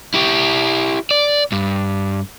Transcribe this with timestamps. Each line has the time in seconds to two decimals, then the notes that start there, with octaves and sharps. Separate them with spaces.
0.14 E4 G4
1.11 D5
1.52 G2